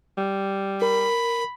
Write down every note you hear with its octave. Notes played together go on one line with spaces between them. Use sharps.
G3
A#4 B5